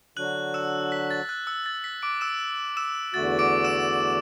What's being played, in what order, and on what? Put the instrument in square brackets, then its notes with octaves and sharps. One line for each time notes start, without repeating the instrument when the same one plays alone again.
[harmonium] D3 F#3 D4 F#4 [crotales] F#6 F#7
[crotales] E6 E7
B6
A6
F#6
E6
A6
B6
D6 D7
E6 E7
E6 E7
[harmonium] E2 D3 A3 F#4 [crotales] A6
[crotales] D6 D7
E6 E7